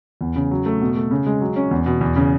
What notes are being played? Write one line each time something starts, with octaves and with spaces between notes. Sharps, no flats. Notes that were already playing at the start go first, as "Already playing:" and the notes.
E2
C#3
F#3
A3
B2
A3
C#3
G#3
F#3
C#4
E2
B2
E2
C#3